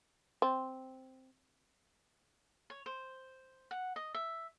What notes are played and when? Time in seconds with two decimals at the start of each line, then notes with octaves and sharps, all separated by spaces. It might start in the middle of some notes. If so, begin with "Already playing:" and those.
0.42 C4
2.70 C#5
2.86 C5
3.71 F#5
3.96 D#5
4.14 E5